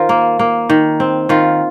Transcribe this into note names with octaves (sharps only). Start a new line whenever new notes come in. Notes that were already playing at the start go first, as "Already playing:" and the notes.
Already playing: D#3 F4 A#4 C5
A#3
A#3
D#3
C4
D#3 F4